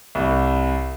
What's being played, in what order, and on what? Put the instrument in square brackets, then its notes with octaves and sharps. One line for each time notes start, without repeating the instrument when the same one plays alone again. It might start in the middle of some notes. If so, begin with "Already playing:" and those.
[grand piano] C2